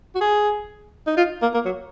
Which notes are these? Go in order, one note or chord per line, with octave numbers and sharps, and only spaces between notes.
F#4
G#4
D#4
F4
A#3
A#3
F#3